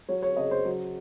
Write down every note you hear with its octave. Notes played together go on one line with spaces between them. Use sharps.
F#3 C#5
C#5
C#3 D#5
C5
F#3